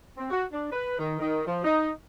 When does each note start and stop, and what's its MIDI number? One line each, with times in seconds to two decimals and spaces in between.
0.18 0.29 60
0.31 0.44 66
0.52 0.70 62
0.72 0.97 71
0.98 1.18 51
1.20 1.44 51
1.47 1.63 53
1.65 1.91 63